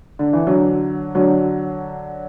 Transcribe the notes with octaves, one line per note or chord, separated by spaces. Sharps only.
D3
E3
D3 F#3
D3 F#3